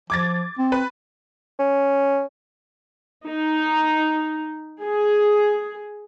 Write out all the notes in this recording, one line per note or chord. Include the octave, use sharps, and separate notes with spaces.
F3 D6 G#6 A6
C4
B4
C#4
D#4
G#4